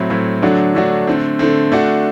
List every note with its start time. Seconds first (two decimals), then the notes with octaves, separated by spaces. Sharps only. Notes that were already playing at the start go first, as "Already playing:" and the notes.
Already playing: A2 F#3 C4 E4
0.10 A2 F#3 C4 E4
0.42 D3 F#3 A3 D4 F#4
0.75 D3 F#3 A3 D4 F#4
1.07 D3 A3 C4
1.39 D3 A3 C4
1.72 D3 A3 D4 F#4